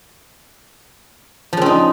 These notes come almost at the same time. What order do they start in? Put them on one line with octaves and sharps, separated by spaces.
F3 C#3 C4 D#4